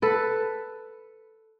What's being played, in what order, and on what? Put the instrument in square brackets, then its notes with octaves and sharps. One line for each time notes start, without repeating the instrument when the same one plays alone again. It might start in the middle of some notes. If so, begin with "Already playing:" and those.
[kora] A4 B4